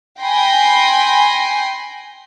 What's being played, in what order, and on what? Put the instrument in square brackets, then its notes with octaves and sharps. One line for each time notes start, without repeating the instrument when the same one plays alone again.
[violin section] G5 G#5 B5 C6 A#6